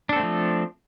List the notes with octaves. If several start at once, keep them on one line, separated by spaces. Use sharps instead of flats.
F3 A3 C4 D4 A4